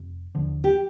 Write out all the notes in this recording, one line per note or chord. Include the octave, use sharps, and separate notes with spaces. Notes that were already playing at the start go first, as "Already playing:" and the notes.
Already playing: F1
D#2 D3 F3
G4